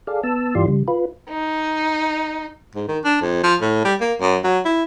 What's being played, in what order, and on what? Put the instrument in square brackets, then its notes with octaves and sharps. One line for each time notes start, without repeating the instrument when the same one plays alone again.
[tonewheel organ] G#4 A4 D5 F5
B3 A5 E6
G2 E3 F4 G4 D5 C6
C#3 G3
F4 B4
[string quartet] D#4
[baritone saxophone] G#2
D#3
D4
F2
F3
A2
G3
A#3
F#2
F#3
E4